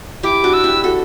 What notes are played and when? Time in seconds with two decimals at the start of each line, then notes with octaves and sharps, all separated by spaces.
0.23 E4 G4 D6
0.44 D4 F#4
0.53 E6
0.64 E4 G4
0.84 F#4 A4